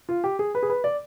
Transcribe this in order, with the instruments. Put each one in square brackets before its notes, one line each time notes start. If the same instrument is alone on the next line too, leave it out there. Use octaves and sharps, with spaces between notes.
[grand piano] F4
G4
G#4
B4
G#4
B4
D5